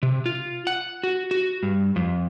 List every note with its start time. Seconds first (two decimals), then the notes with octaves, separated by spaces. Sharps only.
0.03 C3
0.26 F4
0.67 F#5
1.03 F#4
1.31 F#4
1.63 G2
1.96 F2